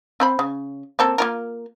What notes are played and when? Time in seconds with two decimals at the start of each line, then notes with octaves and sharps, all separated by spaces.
0.20 C4 C5 B5
0.39 C#3
0.99 A#3 C4 A4
1.18 A#3 F4 A#4